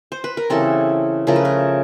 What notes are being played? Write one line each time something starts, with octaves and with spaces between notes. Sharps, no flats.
C5
B4
A#4
C#3 E3 G3 C4 A4
C#3 F3 A3 A#4
B4
A#4